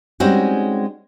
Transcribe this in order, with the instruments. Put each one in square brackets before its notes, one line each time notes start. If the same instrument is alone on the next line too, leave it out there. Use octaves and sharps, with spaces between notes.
[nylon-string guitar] G3 G#3 C4 C#4 D#4 F#4